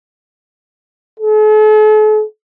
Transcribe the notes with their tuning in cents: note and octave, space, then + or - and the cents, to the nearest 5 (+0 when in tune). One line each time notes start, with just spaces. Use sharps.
A4 -45